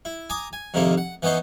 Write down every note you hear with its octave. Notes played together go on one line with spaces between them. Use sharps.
E4
G#5 A#5 D6 D#6
G#5
F2 G#2 C3 D#3 A#3 E4
F#5
E3 B3 C#4 D#4 C5